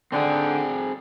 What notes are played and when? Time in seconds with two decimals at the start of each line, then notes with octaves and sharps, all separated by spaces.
0.12 D3 C4 G#4 F#5 G5